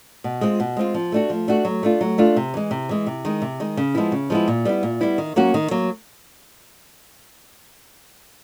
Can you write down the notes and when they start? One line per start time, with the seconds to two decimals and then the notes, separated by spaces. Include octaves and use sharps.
0.24 B2
0.41 G#3 C4 F4
0.60 B2
0.77 G#3 C4 F4
0.94 F3
1.12 A3 D4 F#4
1.30 F3
1.48 A3 D4 F#4
1.65 F#3
1.83 A3 D4 F4
2.01 F#3
2.18 A3 D4 F4
2.36 C3
2.54 E3 G#3
2.71 C3
2.89 E3 G#3
3.07 C3
3.25 D#3 G#3
3.42 C3
3.60 D#3 G#3
3.77 C#3
3.95 F3 G#3 B3 E4
4.12 C#3
4.30 F3 G#3 B3 E4
4.48 A#2
4.65 G3 B3 E4
4.83 A#2
5.01 G3 B3 E4
5.18 D#3
5.36 F#3 A#3 C#4 F#4
5.54 D#3
5.71 F#3 A#3